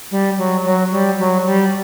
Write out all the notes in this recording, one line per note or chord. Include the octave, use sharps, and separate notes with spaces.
G3
F#3
F#3
G3
F#3
G3